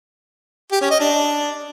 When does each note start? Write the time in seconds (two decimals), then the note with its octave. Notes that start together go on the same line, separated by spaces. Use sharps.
0.72 G4
0.81 C#4
0.91 D#5
1.00 D4